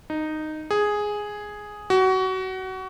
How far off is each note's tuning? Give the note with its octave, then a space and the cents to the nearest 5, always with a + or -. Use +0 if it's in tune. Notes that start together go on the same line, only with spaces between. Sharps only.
D#4 -10
G#4 +0
F#4 +25